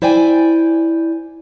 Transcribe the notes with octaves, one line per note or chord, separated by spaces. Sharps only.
E4 C5 D5 G5 G#5